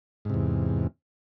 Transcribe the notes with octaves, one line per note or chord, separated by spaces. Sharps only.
E2 G#2 C3